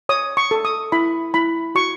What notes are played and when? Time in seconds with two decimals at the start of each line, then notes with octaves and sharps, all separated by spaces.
0.09 C#5 D#6
0.37 C#6
0.51 A4
0.65 D#6
0.92 E4 B5
1.34 E4 B5
1.75 F#4 C#6